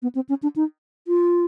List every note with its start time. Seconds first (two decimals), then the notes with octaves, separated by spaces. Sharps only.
0.02 B3
0.15 C4
0.29 C#4
0.43 D4
0.56 D#4
1.08 F4